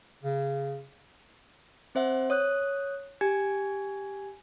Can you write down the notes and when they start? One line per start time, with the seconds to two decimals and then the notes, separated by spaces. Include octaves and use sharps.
0.23 C#3
1.95 C4 C5 E5 F#5
2.30 C#5 D#6 F#6
3.21 G4 G#5 G#6